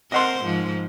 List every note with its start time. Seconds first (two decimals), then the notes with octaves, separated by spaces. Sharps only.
0.12 C4 A#4 C5 D#5 F#5 C6
0.43 G#2 F3